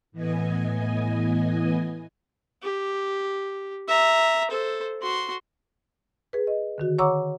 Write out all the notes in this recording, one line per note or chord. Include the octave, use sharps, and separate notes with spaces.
A2 E3 B3 D#5 G#5
G4
E5 A#5
A4 C5
F#4 C6
G#4 B4
D#5
D3 D#3 F#4
C#5 F#5 A#5 C#6 D6 E6